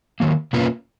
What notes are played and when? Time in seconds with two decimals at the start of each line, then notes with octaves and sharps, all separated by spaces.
0.20 D#3 F#3 A#3
0.53 B2 A#3 C#4 F4 B4